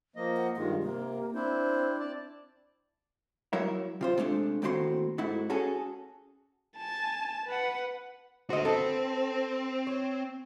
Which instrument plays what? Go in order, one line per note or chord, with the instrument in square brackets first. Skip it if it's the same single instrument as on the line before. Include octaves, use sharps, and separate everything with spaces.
[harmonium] F3 A#3 D#5
[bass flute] F#5
[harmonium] G2 D#3 G#3 [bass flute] F4
[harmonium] C3 [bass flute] A#3
[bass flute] C4 [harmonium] D4 E4 C5
[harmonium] D5 A5
[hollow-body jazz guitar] F#3 E4 A#4 C#5 E5
C3 F4 C5
C3 G#3 A3 D4
D#2 A2 C4 F#4 D#5 C6
G#2 A3 E4 F#4
C#4 F#4 G#4 A4
[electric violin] G#5 A5
B4 F#5
[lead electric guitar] D3 F#4 [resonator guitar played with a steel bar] C5 D#5
[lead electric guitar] C4 [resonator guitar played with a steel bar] A4 B4
[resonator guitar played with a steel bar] C#5